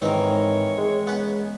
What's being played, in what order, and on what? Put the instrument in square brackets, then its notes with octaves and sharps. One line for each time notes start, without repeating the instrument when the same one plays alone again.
[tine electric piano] G#2 [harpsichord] D#3 C4 [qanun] E3 A#4 [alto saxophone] C#5
[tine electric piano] G#3
[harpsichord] B3 C#4 B4